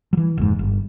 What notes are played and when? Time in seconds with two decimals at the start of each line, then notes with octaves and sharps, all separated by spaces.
0.13 E3 F#3
0.38 F1 G#2
0.59 G1